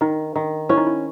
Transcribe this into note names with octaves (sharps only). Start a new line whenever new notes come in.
D#3 D#4
D#3
C#4 E4
D#4
E4